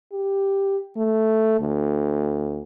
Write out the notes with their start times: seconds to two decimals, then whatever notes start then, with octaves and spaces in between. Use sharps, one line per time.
0.13 G4
0.97 A3
1.61 D2